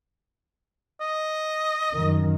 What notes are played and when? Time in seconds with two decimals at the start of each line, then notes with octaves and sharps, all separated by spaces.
1.01 D#5
1.93 F#2 D#3